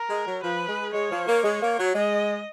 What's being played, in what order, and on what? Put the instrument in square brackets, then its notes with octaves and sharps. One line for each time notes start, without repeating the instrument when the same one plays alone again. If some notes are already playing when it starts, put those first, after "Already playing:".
Already playing: [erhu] A#4
[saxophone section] G#3
F#3
[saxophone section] F3 [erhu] B4
[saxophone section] G#3
[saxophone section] G#3 [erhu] C#5
[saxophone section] F3
A#3
G#3
A#3
F#3
[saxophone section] G#3 [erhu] D#5